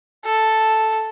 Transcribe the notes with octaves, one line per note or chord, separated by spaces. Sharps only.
A4